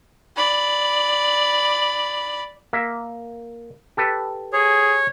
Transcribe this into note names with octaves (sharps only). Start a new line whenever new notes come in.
D5 B5
A#3 E5
G4 A4 B4
G#4 C#5